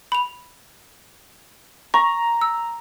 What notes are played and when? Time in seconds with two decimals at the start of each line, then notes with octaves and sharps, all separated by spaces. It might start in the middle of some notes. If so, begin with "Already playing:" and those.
0.12 B5 F7
1.94 A#5 C#6
2.41 E6